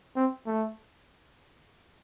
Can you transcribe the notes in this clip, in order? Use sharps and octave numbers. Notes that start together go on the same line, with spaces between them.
C4
A3